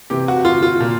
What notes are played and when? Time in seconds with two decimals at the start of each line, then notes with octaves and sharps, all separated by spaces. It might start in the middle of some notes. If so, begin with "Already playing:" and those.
0.10 C3 E3 G4
0.28 F#4
0.45 F4
0.63 F4
0.80 A#2